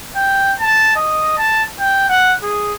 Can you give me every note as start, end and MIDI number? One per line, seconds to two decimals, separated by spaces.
0.16 0.53 79
0.60 0.96 81
0.96 1.36 75
1.38 1.63 81
1.79 2.07 79
2.09 2.34 78
2.43 2.73 68